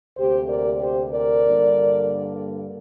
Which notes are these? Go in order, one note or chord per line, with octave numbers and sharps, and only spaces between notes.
D2 C3 A#3 G4 C5
A#4 D5
G4 C5
A#4 D5
G2 D3 A#3